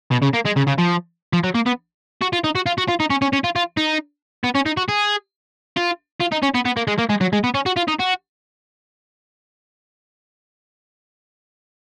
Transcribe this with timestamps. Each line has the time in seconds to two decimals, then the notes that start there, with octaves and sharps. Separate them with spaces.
0.11 B2
0.22 C#3
0.33 A#3
0.45 G#3
0.56 C#3
0.67 C#3
0.78 F3
1.33 F3
1.44 F#3
1.55 A#3
1.66 B3
2.22 F#4
2.33 F4
2.44 D#4
2.55 F#4
2.66 F4
2.78 F#4
2.88 F4
3.00 D#4
3.10 C#4
3.22 C#4
3.33 C#4
3.44 F4
3.56 F4
3.77 D#4
4.44 B3
4.55 C#4
4.66 D#4
4.77 F#4
4.89 G#4
5.77 F4
6.21 F4
6.32 D#4
6.43 C#4
6.55 B3
6.66 B3
6.77 A#3
6.88 G#3
6.99 A#3
7.10 G#3
7.21 F#3
7.33 G#3
7.44 B3
7.54 C#4
7.66 F#4
7.76 F4
7.88 D#4
7.99 F#4